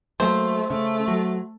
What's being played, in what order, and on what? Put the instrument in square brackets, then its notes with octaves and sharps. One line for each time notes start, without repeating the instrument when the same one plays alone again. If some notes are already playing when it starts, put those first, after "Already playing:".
[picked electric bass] F#3 A#3 [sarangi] A3 [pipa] C5
[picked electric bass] C#3 [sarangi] A3
[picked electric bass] F#3